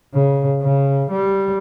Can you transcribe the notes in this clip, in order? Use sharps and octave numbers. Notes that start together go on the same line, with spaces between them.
C#3
C#3
G3